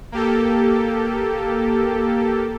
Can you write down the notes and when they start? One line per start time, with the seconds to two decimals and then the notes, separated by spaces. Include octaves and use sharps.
0.12 A#3 G4 A4